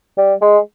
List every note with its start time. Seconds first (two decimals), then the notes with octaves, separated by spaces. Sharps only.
0.17 G3
0.41 G#3